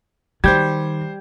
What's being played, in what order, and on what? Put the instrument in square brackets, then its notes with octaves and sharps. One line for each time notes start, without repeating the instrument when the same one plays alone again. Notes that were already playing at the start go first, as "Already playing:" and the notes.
[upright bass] D#3 [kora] G3 [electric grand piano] C5 G6 G#6